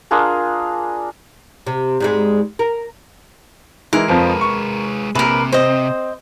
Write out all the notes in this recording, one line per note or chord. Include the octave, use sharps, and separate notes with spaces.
D4 F4 G#4 A#4
C3
G#2 G3 G#3
A#4
E3 G#3 E4 A#4
F2 F3 G#3 B4
C#6
A#1 C3 A#4 B4
C4 C5 D#5